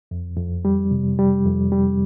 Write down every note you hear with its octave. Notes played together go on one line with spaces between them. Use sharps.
F2
F2
G3
C3
G3
F2
G3